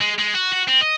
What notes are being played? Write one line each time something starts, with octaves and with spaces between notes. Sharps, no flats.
G#3
G#3
F#4
F#4
C4
D#5